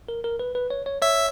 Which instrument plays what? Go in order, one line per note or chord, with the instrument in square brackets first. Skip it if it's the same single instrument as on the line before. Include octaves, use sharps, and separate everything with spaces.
[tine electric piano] A#4
A#4
B4
B4
C#5
C#5
[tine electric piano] C#5 [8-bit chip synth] E5